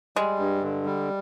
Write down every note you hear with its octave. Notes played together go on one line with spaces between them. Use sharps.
G3 G#3
G2
D3
G3